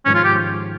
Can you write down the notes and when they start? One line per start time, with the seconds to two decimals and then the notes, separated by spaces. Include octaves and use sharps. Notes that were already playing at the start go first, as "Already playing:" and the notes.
0.05 G#1 G#2 F3 C#4
0.15 F4
0.24 G4